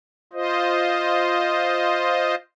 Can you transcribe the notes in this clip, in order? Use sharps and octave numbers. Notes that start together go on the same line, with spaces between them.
F4 C5 D#5